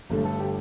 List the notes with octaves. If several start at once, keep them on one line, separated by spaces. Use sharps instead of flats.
G1 G2 D3 A3
A4
G4